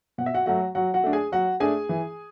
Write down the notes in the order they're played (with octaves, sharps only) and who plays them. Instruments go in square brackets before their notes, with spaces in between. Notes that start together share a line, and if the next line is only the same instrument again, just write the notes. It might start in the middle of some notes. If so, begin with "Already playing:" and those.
[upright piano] B2 F#5
E5
F#4 F#5
F#3 A3 F#4 F#5
F#3 F#4 F#5
F#4 F#5
A3 D4
G#4 G#5
F#3 F#4 F#5
A3 D4 G#4 G#5
E3